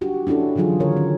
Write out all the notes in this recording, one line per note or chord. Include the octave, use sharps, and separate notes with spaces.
D4 F#4 G4
C#4 D4 E4 F#4 A4
D3 E3 F#3 F4 G#4
D3 D#3 A#4 C#5
C#4